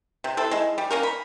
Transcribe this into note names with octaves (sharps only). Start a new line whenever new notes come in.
C3
C4 E4 A4
G#3 E4
G3
A#3 C#4 A#4
B5